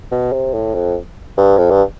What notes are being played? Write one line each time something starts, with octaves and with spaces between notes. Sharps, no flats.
B2
C3
A2
F2
G2
F2
G2